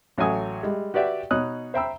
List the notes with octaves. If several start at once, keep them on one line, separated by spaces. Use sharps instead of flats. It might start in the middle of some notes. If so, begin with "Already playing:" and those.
A1 F#3 A3 G#5 D#6
G3 G#3
F#4 G4 B4 D5 E5 G5
B2 D#4 C#5 D#6 F#6
C5 E5 G5 A#5 B5 E6